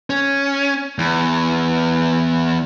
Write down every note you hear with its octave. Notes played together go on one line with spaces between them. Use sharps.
C#4
E2